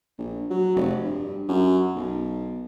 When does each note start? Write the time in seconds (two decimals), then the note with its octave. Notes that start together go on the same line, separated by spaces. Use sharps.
0.18 A#1
0.50 F#3
0.76 F1
1.04 G2
1.48 F#2
1.95 B1